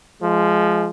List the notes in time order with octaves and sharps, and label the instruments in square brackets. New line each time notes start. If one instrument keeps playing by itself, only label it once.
[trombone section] F3 G#3